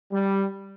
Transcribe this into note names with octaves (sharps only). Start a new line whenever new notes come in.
G3